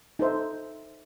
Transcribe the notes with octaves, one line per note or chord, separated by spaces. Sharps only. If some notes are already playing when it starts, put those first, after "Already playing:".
D#4 A4 C5 E5